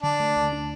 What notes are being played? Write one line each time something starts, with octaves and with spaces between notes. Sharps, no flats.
D3 D4
A3
D2
D4